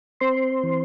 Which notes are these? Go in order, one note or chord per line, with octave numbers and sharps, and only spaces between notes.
C4 C5 C6
E3